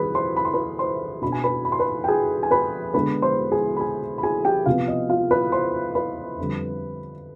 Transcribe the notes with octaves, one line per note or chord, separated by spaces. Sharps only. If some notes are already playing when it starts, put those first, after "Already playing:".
Already playing: D#3 G3 C4 G#4 B4 B5
C5 C6
B5
C6
B4 B5
C5 C6
B2 B3 D4 B5
G#5
B4 B5
B5
C6
B4 B5
G5
G#4 G#5
G#5
B4 B5
D3 G#3 B3 D4 B4 B5
C5 C6
G#4 G#5
B5
G#4 G#5
B5
G#4 G#5
G4 G5
C3 F3 B3 F4 F5
D#5
F4 F5
B4 B5
C5 C6
B4 B5
F2 D3 G3